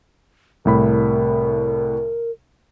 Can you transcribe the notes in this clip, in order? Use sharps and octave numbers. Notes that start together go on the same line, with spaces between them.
C2 A2 A#4 B5